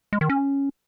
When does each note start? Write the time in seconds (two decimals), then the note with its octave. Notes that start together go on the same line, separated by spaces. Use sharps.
0.13 G#3
0.21 D#3
0.29 C#4